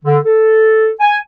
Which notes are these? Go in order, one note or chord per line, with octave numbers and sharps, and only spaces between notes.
D3
A4
G#5